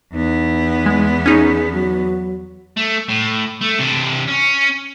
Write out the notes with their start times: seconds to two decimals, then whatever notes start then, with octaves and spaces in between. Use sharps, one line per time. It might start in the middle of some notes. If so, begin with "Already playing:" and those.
0.13 E2 B3 D#4
0.86 G#3
1.26 C#4 D#4 G#4
1.73 F#3
2.77 A3
3.09 A2
3.61 A3
3.79 C3 D4
4.27 C#4